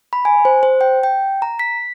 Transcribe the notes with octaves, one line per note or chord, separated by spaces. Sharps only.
B5
G#5
C5
C5
G5
G5
A#5
B6